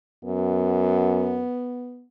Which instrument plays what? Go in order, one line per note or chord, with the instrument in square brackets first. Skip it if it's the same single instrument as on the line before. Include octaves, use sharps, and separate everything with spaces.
[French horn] F#2 [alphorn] B3